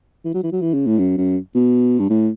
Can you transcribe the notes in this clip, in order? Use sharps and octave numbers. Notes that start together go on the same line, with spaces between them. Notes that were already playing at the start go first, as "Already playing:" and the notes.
E3
F#3
E3
F#3
E3
C#3
A2
F#2
F#2
B2
G2
A2